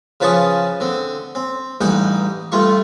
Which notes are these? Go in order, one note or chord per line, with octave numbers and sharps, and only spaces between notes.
C#3 F3 B4 A5 C#6 D#6
D3 C4
C4
A1 G2 D#4 F#5 G5
G2 A3 F4 C#6